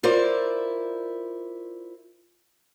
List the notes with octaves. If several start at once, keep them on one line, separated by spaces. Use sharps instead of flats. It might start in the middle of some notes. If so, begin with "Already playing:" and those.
E4 F4 A#4 C5 D5